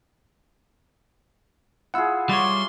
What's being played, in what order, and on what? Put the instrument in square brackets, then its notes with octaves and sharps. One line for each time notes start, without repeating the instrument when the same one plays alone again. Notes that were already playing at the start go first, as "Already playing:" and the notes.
[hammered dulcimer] E4 F4 G#4 [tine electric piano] F#5 E6
[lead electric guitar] G3 C#5 [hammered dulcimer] D5 [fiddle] C6